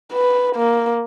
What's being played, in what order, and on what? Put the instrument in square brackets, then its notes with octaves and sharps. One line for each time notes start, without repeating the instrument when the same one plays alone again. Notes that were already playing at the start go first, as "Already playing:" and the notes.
[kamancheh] B4
A#3